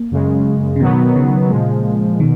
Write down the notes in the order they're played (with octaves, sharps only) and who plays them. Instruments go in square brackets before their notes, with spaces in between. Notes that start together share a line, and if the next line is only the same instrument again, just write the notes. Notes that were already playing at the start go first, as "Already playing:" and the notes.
Already playing: [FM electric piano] A#3
[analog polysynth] F#2 C#3 G#3
[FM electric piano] C#3
[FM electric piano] B2 [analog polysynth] D#3 F#3 B3
[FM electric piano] C#3
[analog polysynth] A#2 F3 G#3
[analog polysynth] B2 [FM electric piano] D#3